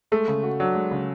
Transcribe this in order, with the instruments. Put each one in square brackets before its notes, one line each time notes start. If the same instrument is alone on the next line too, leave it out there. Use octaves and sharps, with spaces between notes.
[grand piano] G#3 [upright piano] A3
[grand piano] C#3
F#4
[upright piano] F#3 [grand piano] D4
[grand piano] G#3
C#3